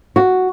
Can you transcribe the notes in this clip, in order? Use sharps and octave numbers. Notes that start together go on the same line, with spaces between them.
F#4